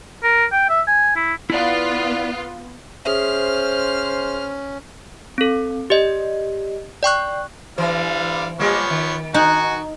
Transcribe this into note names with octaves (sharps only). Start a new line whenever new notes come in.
A#4
G5
E5
G#5
E4
B3 E4 F4 D5
C#4 G#4 C5 E5 F6
C4 A4
G4 D5 D#5
D5 G5 C#6 F#6
D3 E3 G3 C5 F5
F3 G3 A#3 B3 C#5
D#3
D#4 F#4 F#5 G#5